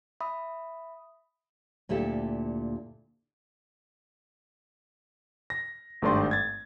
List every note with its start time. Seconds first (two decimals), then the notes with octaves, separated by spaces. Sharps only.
0.20 E5 B5 D#6
1.89 D2 A#2 E4 G4 A4
5.50 A#6
6.02 G#1 G2 A3 G4 D5 C6
6.31 G#6 A6